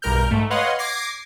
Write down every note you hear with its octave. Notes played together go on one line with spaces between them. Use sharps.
B1 G2 A#4 F6 G6
G#2 A3
B4 C#5 D#5 F5 F#5 C6
D6 G#6 A#6 C7